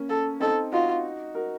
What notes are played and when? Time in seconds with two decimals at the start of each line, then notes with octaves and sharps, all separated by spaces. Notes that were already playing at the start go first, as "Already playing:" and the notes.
Already playing: A#3 C#4
0.09 A4
0.40 C4 D#4 A4
0.72 D#4 F4 F#4
1.35 F#4 A#4